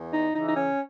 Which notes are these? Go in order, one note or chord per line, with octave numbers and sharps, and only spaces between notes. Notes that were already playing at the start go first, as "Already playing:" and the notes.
Already playing: E2
D#4
C#3 E3 D#4
D#4
C#4